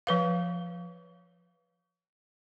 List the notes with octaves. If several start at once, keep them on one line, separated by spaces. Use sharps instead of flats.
F3 B4 F5